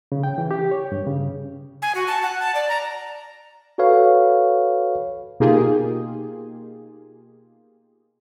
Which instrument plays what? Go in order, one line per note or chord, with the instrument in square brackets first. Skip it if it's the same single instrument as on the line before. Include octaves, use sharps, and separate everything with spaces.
[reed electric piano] C#3
G5
E3
G4
C#5
G2
C#3
[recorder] G#5
F#4
A5
F#5
A5
D5
A#5
[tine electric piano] F#4 A4 B4 C#5 F5
[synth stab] B2 A#3 D#4 F4 G4 G#4